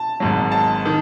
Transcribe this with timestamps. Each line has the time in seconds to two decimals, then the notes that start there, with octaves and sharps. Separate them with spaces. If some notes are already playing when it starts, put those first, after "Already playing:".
Already playing: A5
0.20 G#1 G#2 F#3
0.52 A5
0.86 D#3